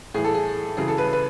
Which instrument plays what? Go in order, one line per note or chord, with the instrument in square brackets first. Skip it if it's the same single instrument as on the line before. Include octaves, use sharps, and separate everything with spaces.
[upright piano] A2 E3 G#4
A4
G#4
F#2 C#3 E3 G#4
A4
B4
B4